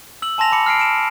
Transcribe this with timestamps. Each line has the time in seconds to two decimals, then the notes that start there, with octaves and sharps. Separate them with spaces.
0.22 E6 F#7
0.38 G#5 A5 C6 A#6 F7
0.52 B5 D6 C#7
0.66 F6 C7 D7
0.79 D7 E7